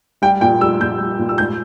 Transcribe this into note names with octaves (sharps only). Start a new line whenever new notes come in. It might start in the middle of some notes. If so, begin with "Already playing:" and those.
G3 G5
A#2 G5
G3 E6
A#2 G6
G3
A#2
E6
G#2 G6